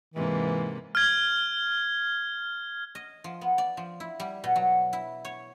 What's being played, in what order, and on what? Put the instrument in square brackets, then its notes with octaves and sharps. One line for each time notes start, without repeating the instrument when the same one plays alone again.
[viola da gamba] G#2 C3 A#3 [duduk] E3
[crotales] F6 G#6
[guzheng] D#5
F3
B3
D5
F3
E4
G3
B2
F#3
E4
C#5